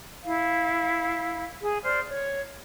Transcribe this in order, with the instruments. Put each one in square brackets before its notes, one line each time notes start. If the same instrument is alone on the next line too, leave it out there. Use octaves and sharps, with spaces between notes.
[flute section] E4 F5
G#4
C5 D5 F6
C#5